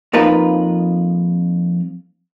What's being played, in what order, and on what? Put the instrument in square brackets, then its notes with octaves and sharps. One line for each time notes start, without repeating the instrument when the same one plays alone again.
[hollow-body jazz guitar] F2 F3 A#3 D#4 F4 B4